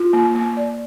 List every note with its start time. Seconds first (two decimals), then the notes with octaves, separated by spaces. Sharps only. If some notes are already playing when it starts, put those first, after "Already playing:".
Already playing: F4
0.13 A#3
0.35 A#3
0.57 D5